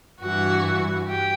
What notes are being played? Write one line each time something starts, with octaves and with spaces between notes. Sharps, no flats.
G2 E3 F#4
G4